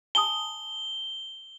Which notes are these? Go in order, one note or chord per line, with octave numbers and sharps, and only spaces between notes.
G#5 A5 D#6 G7